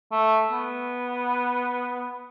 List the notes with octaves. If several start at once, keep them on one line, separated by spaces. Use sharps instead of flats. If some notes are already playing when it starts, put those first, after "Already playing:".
A3
B3